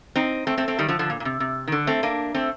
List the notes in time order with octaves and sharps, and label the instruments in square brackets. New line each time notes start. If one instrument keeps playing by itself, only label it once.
[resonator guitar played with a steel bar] C4 D#4
A3 C4
A3 C4
A3 C4
D#3 G3
D3 F3
D3 F3
A#2
A#2
C3
C3
D#3
D3
A3 C4
A#3 D4
A3 C4